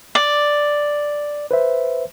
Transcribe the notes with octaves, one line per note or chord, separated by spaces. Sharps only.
D5
B4 C5 E5